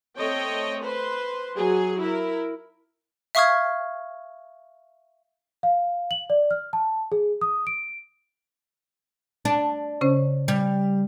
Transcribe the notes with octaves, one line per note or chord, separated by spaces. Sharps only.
A3 C4 C#5 D#5 G5
B4 C5 C6
F#3 G#4
E4 A#4
E5 F5 C#6 D#6 F6 G#6
F5
F#7
D5
F6
A5
G#4
D#6
D7
D4
C#3 C#4 C5
G3